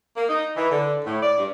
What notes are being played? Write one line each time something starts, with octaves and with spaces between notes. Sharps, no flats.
A#3
D#4
E3
D3
A2
D5
G2